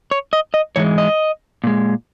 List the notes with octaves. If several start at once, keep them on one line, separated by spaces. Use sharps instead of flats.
C#5
D#5
D#5
G#2 E3 G#3 C#5
D#5
A#2 G#3